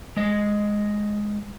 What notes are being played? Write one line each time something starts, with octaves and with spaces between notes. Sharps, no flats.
G#3 D#5